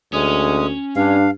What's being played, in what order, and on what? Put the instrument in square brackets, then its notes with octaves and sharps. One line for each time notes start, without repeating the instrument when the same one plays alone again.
[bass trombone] D2 [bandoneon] G#3 D#6 [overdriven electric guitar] C#4
[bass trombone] G2 [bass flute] D4 [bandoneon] F5